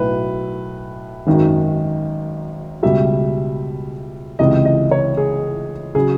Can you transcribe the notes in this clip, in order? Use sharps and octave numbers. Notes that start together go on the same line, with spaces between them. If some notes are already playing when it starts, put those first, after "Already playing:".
Already playing: B1 A2 F#3 B4
G#1 F#2 D#3 F#3
C#2 B2 G3 E5
C#2 C3 E3 D#5
D#5
C#5
G#4
C#3 F#3 G#4